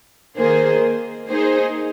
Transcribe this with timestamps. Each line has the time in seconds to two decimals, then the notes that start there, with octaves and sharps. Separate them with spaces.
0.37 D#3 A#3 G#4 C5
1.27 A#3 D#4 G#4 C5